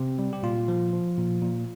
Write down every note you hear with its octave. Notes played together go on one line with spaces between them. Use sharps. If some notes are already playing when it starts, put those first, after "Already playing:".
Already playing: C3 C4
G3
G4
A#2 F4
F3
F3
A#2
A#2